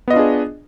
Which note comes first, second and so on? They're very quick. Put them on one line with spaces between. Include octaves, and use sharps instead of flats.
B3 D#5 F4 D4 G#4